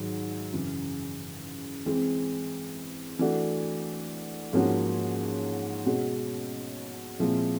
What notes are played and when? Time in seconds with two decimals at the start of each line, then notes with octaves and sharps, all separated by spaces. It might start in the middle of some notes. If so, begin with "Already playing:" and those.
Already playing: G#2 D#3 F#3
0.52 F#2 C#3 E3
1.86 E3 G#3 C4
3.19 E3 A3 D4 F#4
4.53 G#2 F3 A#3 C#4 F#4
5.86 B2 G#3 C#4 F#4
7.19 A#2 F3 G#3 C4 E4